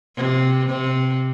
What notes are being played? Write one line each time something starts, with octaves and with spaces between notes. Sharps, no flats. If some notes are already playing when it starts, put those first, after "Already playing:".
C3
C3